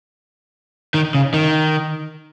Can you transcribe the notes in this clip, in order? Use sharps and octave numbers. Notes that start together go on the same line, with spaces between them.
D#3
C#3
D#3